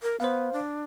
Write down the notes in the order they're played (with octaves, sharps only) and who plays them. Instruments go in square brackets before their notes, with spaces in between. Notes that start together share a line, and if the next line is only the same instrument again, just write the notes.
[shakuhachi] A#4
[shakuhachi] B3 [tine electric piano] C5 F5
[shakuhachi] D4